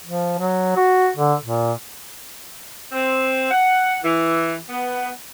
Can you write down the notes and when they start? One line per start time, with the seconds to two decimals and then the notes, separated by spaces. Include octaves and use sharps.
0.04 F3
0.39 F#3
0.76 F#4
1.17 D3
1.44 A#2
2.91 C4
3.49 F#5
4.02 E3
4.67 B3